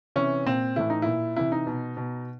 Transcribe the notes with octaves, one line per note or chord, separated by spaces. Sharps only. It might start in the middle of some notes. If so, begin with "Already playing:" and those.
C3 E3 C#4
A#2 C4
A2 E3 E4
D#4
A#2 E4
C3 E3 E4
D#4
B2
B2